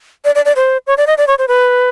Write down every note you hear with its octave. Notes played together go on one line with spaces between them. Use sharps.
D5
D5
D5
C5
C#5
D5
D#5
D5
C#5
C5
B4